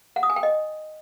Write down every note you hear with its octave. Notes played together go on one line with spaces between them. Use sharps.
F#5
D#6
G#5
G5
D#5